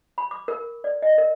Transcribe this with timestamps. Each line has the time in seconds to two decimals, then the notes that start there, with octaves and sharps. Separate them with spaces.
0.18 B5
0.31 D6
0.48 A#4
0.84 D5
1.02 D#5
1.18 A#4